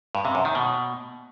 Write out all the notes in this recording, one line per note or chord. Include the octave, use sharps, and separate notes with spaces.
G2
C3
F#2
D#3
B2